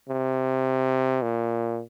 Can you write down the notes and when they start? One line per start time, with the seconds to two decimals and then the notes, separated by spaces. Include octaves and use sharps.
0.09 C3
1.22 A#2